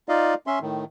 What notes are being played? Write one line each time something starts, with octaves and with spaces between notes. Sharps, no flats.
D#4 F4 D5 D#5 F5
C#4 E5 C6
A2 D#3